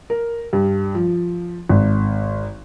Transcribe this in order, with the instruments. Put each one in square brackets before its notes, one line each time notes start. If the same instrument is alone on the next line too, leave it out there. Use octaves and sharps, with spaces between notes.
[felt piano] A#4
G2
F3
G#1